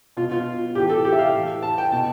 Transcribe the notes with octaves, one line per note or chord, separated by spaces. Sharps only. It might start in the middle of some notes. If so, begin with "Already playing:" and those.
B2 F4
F4
A2 E3 G4
A4
G4
E5
F5
A2 E3
A5
G5
B2 A5